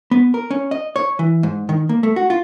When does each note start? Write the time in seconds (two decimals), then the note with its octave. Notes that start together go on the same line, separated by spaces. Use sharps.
0.11 B3
0.34 A#4
0.51 C#4
0.71 D#5
0.96 C#5
1.19 E3
1.43 G#2
1.69 D#3
1.89 A#3
2.03 A3
2.16 F#4
2.30 F4